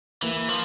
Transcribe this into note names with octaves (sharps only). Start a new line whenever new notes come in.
E3 A#3
F3